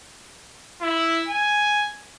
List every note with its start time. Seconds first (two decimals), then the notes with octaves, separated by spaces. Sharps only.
0.81 E4
1.28 G#5